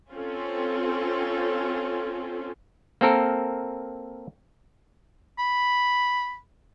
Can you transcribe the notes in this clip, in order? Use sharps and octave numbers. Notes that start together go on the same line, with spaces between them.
C4 C#4 F4 A4
A#3 C4 A4 A#4
B5